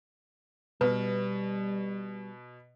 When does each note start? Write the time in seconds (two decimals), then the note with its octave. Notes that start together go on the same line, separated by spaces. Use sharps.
0.81 B2 G3 B4